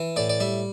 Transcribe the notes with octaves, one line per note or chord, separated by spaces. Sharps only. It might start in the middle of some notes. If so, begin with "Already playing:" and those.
Already playing: E3
A2 D5
D5
G3 E5